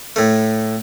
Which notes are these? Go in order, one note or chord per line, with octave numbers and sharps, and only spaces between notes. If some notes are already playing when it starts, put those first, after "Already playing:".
A2 A3